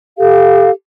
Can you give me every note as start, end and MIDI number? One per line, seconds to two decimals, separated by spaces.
0.18 0.70 67
0.18 0.70 69
0.18 0.70 77